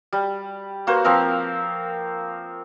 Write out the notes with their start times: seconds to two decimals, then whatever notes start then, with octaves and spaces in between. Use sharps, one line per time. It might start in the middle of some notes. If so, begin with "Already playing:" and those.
0.13 G3
0.87 A#3 F#4 B4 C5
1.04 F3 C4 A#4 F5